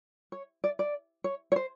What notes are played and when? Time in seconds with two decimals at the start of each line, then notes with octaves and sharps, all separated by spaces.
0.32 C#5
0.64 D5
0.79 D5
1.24 C#5
1.52 C#5
1.56 C5